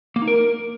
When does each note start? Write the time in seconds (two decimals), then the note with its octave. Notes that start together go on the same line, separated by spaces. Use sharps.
0.16 A#3
0.22 D#4
0.28 A#4